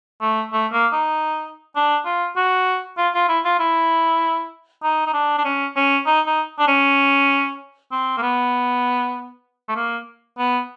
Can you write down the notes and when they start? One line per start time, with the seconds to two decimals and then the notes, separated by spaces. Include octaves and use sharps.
0.21 A3
0.53 A3
0.73 A#3
0.93 D#4
1.76 D4
2.06 F4
2.36 F#4
2.98 F4
3.15 F4
3.29 E4
3.45 F4
3.60 E4
4.83 D#4
5.07 D#4
5.14 D4
5.38 D4
5.45 C#4
5.76 C#4
6.06 D#4
6.27 D#4
6.59 D4
6.68 C#4
7.92 C4
8.17 A#3
8.23 B3
9.69 A3
9.76 A#3
10.38 B3